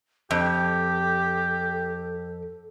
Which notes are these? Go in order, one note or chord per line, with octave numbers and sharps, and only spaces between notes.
F2 G4 A4